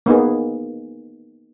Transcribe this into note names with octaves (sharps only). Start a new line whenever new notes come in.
A#3 B3 D#4 G#4